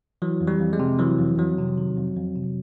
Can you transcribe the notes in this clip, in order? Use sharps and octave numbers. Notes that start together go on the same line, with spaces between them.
E3 F#3
F2
G3
F2
G#3
C3
E3 F#3
F2
F2 F#3
C3
D#3
F2
F2
C3